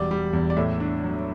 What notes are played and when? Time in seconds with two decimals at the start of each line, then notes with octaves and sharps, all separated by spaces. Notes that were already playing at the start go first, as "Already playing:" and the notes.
Already playing: E1 G3 D5
0.11 G3
0.33 E2
0.50 D5
0.57 A2 E5
0.80 D4
1.04 F#3